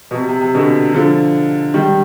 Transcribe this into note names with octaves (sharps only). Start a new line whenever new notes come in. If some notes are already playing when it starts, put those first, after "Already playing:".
B2
C3
C3
C3
B2 D3
D3 F3
D#3 G3